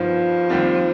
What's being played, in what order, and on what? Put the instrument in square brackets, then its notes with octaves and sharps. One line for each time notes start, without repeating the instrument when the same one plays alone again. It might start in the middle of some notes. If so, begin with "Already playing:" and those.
Already playing: [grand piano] G2 D#3 G3 B3 [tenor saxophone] F3
[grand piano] D#2 D#3 G3 C4